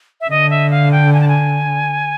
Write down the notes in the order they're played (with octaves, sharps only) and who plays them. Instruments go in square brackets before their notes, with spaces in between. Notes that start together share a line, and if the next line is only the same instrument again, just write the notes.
[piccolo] E5
[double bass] D3 [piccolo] D#5
[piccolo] E5
F5
G5
G#5
A5
G#5